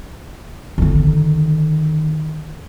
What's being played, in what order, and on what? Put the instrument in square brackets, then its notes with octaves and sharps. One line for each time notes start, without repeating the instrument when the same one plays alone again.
[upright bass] D3 D#3